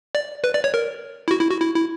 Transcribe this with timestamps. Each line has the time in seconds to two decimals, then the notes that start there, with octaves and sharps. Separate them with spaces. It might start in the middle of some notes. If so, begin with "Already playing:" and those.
0.15 D5
0.44 B4
0.54 D5
0.64 C#5
0.74 A#4
1.28 E4
1.31 F#4
1.41 E4
1.50 F#4
1.61 E4
1.75 E4